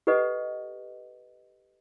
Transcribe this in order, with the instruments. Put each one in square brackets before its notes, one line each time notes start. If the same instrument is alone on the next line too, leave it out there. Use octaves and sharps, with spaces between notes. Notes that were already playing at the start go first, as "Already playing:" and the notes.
[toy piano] G4 A4 B4 D#5 F#5